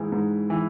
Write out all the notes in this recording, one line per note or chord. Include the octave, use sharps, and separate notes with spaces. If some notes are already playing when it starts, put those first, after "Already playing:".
Already playing: G#2 E3 G#3
G#2
E3